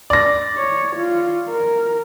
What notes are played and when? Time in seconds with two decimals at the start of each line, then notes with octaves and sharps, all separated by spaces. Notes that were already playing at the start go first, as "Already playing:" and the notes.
0.10 D5 A#6
0.57 C#5
0.96 F4
1.49 A#4